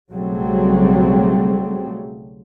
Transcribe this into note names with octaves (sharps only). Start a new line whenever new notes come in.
B1 C#3 F#3 G3 A3 C4